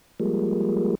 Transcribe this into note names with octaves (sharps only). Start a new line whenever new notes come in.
F3 G3 G#3 A#3